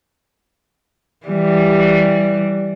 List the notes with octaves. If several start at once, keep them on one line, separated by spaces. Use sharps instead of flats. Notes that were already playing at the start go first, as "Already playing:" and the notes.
E3 G3